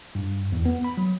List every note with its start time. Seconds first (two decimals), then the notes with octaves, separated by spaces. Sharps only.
0.15 G2
0.52 E2
0.66 B3
0.84 B5
0.97 F#3